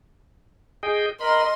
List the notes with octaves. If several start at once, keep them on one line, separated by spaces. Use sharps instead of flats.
G#4 D#5 G5
A#4 D#5 B5 C6